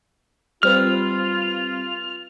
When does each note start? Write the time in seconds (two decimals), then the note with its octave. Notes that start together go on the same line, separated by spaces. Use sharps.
0.63 G3 C4 F4 B4 F6